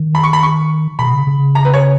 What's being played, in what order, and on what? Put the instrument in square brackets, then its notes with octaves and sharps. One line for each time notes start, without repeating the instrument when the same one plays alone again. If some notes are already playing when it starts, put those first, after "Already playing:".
Already playing: [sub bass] D#3
[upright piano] B5
C#6
B5
C#6
[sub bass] B2 [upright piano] B5
[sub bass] C#3
C#3
[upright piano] A#5
B4
C#5